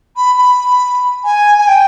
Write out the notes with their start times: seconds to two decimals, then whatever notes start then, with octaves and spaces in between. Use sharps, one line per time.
0.16 B5
0.38 B5
1.24 G#5
1.58 G#5
1.67 G5